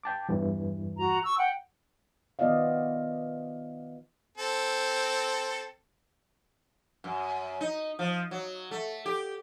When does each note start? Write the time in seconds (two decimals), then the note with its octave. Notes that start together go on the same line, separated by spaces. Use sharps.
0.03 G5 A5 D6
0.29 E2 G2 E3
0.98 F#4 A#5
1.24 C#6 E6
1.37 F#5 G5
2.39 D#3 B3 F4 D5 D#5 F5
4.37 C4 A4
7.04 F#2
7.61 D#4
7.99 F3
8.31 F#3
8.71 A3
9.05 G4